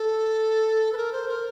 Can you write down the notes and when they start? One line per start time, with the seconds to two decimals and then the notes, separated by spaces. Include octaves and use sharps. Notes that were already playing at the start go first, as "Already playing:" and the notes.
Already playing: A4
0.93 B4
0.97 A#4
1.13 C5
1.28 A#4